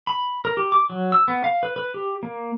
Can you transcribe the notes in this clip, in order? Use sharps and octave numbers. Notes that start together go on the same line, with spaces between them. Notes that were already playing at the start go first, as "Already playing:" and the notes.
B5
A#4
G4
D6
F#3
E6
B3
F5
B4
B4
G4
A#3